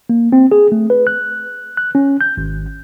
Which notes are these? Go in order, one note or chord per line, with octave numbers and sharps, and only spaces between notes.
A#3
C4
G#4
A3
B4
F#6
F#6
C#4
G6
G#1